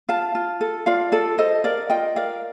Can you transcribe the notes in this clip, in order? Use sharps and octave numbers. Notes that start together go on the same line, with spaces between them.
F4 F5 A5
F4
A4
F4 D5 F5
A4 D5
A4 C5 D#5
A#4 D5 F5
F4 D#5 G5
A#4 D5 F5